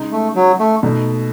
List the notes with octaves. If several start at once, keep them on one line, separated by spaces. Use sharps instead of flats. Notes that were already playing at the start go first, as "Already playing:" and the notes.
Already playing: C#3 G#3 D#4
A3
F#3
A3
B2 A3 D#4